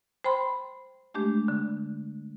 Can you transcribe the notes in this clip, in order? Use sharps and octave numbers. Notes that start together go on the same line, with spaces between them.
C5 G5 B5 C6
G#3 A3 D4 G4
D3